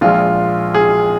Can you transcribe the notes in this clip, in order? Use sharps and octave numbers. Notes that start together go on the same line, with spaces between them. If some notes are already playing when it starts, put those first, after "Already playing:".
A#1 A#2 F3 G#3 F4
G#4